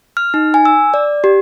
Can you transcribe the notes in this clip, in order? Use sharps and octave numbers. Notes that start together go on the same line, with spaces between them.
F6
D#4
G#5
E6
D5
G4